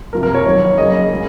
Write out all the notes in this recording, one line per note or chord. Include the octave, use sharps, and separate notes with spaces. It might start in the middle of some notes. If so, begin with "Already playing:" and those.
C3 F3 A#3 A#4
A#4
C#5
D#3 F#3 A#3
C#3 F#3 A#3 D#5
C#3 G#3